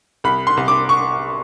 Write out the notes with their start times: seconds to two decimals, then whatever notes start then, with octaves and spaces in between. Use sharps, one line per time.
0.24 C2 B5
0.47 C6
0.57 C2
0.68 D6
0.89 C#6